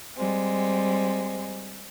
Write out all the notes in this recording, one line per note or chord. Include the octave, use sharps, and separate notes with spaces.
G3 G#3 C4